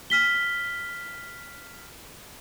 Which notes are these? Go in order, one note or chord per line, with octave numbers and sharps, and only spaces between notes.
F6 B6 G7